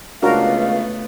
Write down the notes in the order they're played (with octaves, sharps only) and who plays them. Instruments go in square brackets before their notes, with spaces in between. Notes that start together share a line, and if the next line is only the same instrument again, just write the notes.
[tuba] C#2 [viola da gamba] A3 B3 [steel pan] D4 F#4 A#4 [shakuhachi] F5